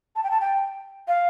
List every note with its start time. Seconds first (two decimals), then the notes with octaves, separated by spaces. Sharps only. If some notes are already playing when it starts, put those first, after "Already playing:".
0.16 A5
0.24 G5
0.31 A5
0.41 G5
1.08 F5